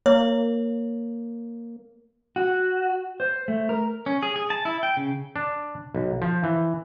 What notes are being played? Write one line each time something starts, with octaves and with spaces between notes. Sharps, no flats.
A#3 C#5
F#4
C5
A3
A#4
C#4
G#4
G#4
A5
E4
G5
C#3
D4
B1
F3
E3